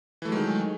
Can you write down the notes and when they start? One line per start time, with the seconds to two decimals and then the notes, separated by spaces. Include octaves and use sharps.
0.22 E3
0.25 A3
0.29 F#3
0.32 G#3
0.35 D#3